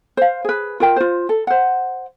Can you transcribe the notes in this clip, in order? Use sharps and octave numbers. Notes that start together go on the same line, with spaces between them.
C5 F5
G#4 B4
F4 A#4 G5
F4 C5
A4
C5 F#5